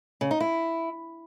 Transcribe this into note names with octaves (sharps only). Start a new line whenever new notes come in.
C#3
D#4
E4